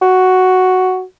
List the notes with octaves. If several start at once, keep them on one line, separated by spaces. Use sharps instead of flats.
F#4